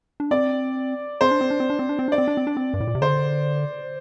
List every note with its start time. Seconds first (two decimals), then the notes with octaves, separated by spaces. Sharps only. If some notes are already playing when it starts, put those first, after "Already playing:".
0.20 D4
0.31 C4 D5
1.21 C4 C5
1.31 D4
1.41 C4
1.50 D4
1.60 C4
1.70 D4
1.79 C4
1.89 D4
1.99 C4
2.08 D4 D5
2.18 C4
2.28 D4
2.37 C4
2.47 D4
2.57 C4
2.74 G2
2.80 A2
2.87 A#2
2.95 C3
3.02 D3 C5